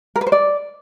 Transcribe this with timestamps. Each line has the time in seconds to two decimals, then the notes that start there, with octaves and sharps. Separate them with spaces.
0.16 A#4
0.21 B4
0.27 C5
0.32 D5